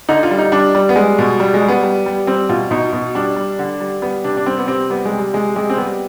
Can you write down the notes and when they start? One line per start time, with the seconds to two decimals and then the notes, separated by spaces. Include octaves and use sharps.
0.09 D3 D#4
0.23 F4
0.31 G3
0.38 D#4
0.52 G3 D4
0.75 G3
0.89 B3
0.96 G3 G#3
1.19 B2
1.40 G3
1.54 G#3
1.62 G3
1.69 B3
1.83 G3
2.06 G3
2.27 G3 C4
2.49 B2 F4
2.71 B2 D#4
2.93 B2
3.15 G3 D4
3.36 G3
3.59 D3
3.80 G3
4.02 G3 B3
4.24 C3 D4
4.37 D4
4.46 G3 C4
4.58 B3
4.68 C3 C4
4.90 G3 B3
5.05 G#3
5.11 C3
5.19 G3
5.33 C3 G#3
5.56 C3 G#3
5.70 C4
5.77 G3 B3